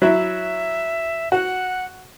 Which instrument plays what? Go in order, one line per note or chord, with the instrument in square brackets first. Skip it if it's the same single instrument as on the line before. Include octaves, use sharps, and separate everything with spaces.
[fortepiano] F#3 E4 [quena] E5
[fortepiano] F#4 [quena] F#5